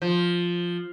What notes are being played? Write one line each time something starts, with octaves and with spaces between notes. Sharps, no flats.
F3